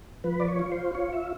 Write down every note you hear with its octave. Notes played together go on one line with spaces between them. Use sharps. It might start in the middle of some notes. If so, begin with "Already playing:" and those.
F3 B4
D5
C#5
F4
C5
F4 C#5
E5